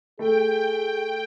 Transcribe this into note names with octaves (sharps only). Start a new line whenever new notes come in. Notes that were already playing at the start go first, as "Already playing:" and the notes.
A3 G#4 G5